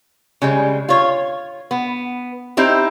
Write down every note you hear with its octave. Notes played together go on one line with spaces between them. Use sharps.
C#3 G3 G#3
F4 C#5
B3
C4 D#4 E4 G4